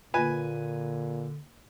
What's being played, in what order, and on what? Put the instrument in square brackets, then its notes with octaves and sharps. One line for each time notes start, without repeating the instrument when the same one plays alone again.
[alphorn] A#2 [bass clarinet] D3 [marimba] A#3 F4 [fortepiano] B4 G#5